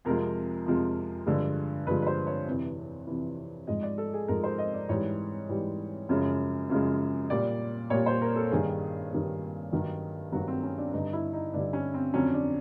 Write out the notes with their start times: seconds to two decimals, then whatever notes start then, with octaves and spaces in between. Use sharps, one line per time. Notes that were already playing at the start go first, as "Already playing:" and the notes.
0.05 F2 C3 F3 G#3 A#4
0.66 F2 C3 F3 G#3
1.26 G2 D3 F3 G#3
1.87 G2 D3 F3 G#3 B4
2.02 B4
2.07 C5
2.27 C#5
2.47 F2 C3 E3
3.07 F2 C3 E3
3.67 G#2 F3 G#3 D#5
3.83 D5
3.98 A4
4.14 G#4
4.28 G#2 F3 G#3 A#4
4.44 C5
4.58 D#5
4.73 D5
4.89 G#2 E3 G3 C#5
5.49 G#2 E3 G3
6.09 F#2 C#3 F3 G#3
6.70 F#2 C#3 F3 G#3
7.30 A#2 G3 D5
7.90 A#2 G3 C#5
8.06 C5
8.22 A#4
8.36 A4
8.51 G2 D#3 G3 G#4
9.12 G2 D#3 G3
9.72 G2 D#3 F#3
10.32 G2 D#3 F#3 F#4
10.48 C4
10.63 C#4
10.78 D4
10.92 G2 D3 G3 D#4
11.13 E4
11.33 D#4
11.53 G2 D3 G3 D4
11.73 C#4
11.94 C4
12.14 F2 D3 F#3 C#4
12.34 D4